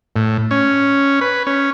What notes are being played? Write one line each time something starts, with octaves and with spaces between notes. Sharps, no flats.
A2
C#4
B4
C#4